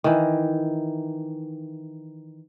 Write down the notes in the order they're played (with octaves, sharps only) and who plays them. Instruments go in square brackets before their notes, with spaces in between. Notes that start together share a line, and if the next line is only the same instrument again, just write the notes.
[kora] D#3 E3